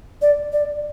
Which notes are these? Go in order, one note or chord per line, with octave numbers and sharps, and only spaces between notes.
D5
D5